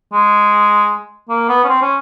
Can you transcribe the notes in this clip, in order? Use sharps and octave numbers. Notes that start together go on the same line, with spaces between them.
G#3
A#3
B3
C#4
C4
C#4